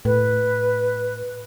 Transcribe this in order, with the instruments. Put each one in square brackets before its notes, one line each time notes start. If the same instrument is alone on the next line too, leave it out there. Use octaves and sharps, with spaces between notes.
[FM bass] A2 [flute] B4